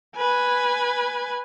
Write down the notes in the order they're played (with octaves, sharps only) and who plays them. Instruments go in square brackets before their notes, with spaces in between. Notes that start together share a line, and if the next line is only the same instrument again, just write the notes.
[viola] B4 G#5